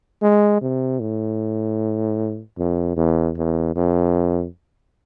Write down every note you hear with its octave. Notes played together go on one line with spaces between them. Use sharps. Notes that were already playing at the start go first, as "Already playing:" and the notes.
G#3
C3
A2
F2
E2
E2
F2